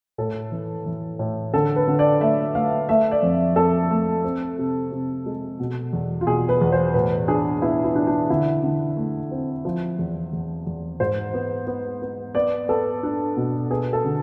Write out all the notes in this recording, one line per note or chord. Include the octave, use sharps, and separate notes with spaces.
A2 A4
E3
E3
A2
D3 A4
B4
D3
D5
A3 E5
A3 F5
A3 E5
D5
F2
F2 A4
A3
C4
C3
C3
G#3
B2
E2
F4
B2 G#4
B4
E2
C5
A2 B4
D4 G#4
B3 E4
E4
D4
D4
D3 E4
D3
A3
C4
F3
E2
E2
E2
G#2 C5
B3
B3
B3
B3 D5
B3 A4
D4
B2
B3 G#4
A4
D3